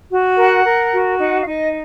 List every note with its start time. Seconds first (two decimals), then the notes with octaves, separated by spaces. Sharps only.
0.10 F#4
0.37 A#4 F#5
0.65 A#4
0.92 F#4
1.19 D#4 F#5
1.42 F5
1.47 D#4 D#5